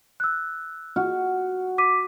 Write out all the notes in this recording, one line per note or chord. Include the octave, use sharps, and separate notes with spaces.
E6 F#6
F#4 F6
D6 B6 D#7